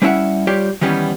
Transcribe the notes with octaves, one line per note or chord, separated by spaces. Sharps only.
G3 B3 C#4 E4 E5 F#5
G3 F4 G4 C#5 D5
D#3 E3 G3 B3 C#4